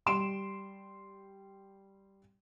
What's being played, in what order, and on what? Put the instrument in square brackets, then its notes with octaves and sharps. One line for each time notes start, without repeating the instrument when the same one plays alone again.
[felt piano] G3 C6 D7 E7